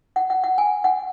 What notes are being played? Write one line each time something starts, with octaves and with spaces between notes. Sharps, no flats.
F#5
F#5
F#5
G#5
F#5